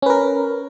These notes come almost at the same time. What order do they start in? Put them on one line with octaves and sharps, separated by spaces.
C#4 B4 A#4